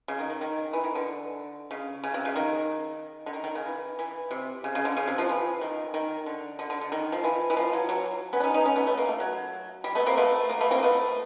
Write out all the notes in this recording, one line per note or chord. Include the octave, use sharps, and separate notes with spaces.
C#3
D#3
D#3
D#3
E3
D#3
D3
C#3
C#3
C3
C#3
D#3
D3
D#3
D#3
C#3
E3
E3
C3
C#3
C#3
D3
C#3
C3
F3
E3
D#3
D#3
D3
D3
D3
D3
D#3
F3
E3
E3
F3
F#3
F#3
B3 C#4
D4
C#4 D#4
C#4 D#4
B3 C#4
A3 B3
A3
A#3
A3
F#3
G3
A3 B3
A#3 C4
A3 B3
A#3
A3 B3
A#3 C4
A3 B3